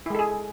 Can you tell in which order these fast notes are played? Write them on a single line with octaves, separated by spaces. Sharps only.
E4 G#3 A4 G#4